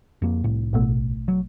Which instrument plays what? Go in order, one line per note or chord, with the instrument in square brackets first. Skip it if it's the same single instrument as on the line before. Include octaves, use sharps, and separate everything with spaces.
[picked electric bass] F2 A#3
C2 A2
[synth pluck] A1 B2 A3
[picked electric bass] F#3